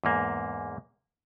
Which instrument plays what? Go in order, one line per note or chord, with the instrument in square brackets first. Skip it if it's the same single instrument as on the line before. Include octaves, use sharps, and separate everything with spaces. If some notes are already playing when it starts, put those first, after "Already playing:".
[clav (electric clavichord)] E2 G#2 A#3